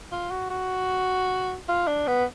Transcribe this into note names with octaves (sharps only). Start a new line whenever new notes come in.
F4
F#4
F#4
F4
D4
B3